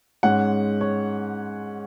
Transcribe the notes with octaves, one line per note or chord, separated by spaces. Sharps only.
G#2 G#3 C#4 F#5
C#5